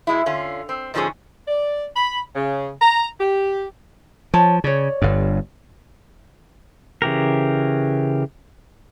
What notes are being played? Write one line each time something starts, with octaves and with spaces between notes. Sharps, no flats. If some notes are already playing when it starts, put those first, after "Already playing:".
B2 G#3 E4
D3 C#4 F4
C4
G#2 D3 F3 F#3 C#4 G#4
D5
B5
C#3
A#5
G4
F3 C#5 A5
C#3 C#5 D5
G1 G2
C#3 E3 G4 A#4